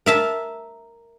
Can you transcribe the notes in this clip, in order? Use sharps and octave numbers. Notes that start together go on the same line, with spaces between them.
A#4 E5 A5